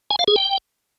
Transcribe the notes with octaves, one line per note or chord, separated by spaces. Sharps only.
G#5
F5
G#4
G5